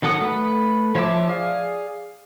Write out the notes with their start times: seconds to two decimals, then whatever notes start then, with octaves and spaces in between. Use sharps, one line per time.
0.02 D#3 F#3 A4 F#5 D#6
0.22 A3 B4
0.95 F3 C#5 E5 A5 D6
1.28 G#4 D5 F5